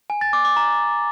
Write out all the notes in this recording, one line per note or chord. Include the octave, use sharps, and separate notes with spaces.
G#5
A6
D6
D6
A#5